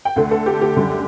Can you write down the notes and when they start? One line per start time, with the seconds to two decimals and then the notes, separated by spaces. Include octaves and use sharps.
0.05 G5
0.16 D2 D3 A3 F#5
0.31 A4
0.46 G4
0.61 G4
0.77 F#2 D3 G3